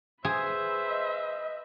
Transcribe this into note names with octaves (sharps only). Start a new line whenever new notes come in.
G#4 B4 C5 E5
D#5